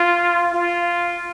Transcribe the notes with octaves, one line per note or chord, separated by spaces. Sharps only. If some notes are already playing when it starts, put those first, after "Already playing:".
Already playing: F4
F4